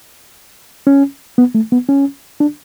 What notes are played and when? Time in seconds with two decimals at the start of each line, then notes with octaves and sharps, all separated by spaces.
0.87 C#4
1.38 B3
1.55 A3
1.72 B3
1.89 C#4
2.40 D4